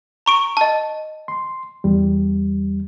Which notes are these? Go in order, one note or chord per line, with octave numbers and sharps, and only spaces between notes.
A#5 C#6 D7
D#5 A5
C6
E2 G3